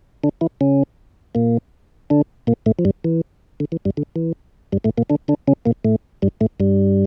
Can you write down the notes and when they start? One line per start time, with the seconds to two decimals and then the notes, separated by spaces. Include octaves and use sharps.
0.24 D3 D4
0.41 E3 E4
0.61 C#3 C#4
1.35 A#2 A#3
2.10 D3 D4
2.47 A#2 A#3
2.66 A2 A3
2.79 F3
2.85 G2 G3
3.05 E3
3.60 D3
3.72 E3
3.85 G2 G3
3.97 D3
4.16 E3
4.72 G2 G3
4.84 A2 A3
4.98 A#2 A#3
5.10 D3 D4
5.28 D3 D4
5.48 C#3 C#4
5.66 A#2 A#3
5.85 A2 A3
6.22 G2 G3
6.41 A2 A3
6.60 G2 G3